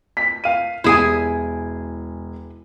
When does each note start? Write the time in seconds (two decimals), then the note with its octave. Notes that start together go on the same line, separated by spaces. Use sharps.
0.17 B6
0.44 F5 D#7
0.84 E1 E4 G#4 G#5